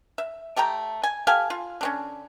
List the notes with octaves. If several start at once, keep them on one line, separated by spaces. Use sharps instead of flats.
E5
A3 G4 G5 A#5
G#5
G4 A4 F5 G#5
F4
D3 C4 C#4